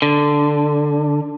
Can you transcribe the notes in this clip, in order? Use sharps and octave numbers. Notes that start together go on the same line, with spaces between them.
D3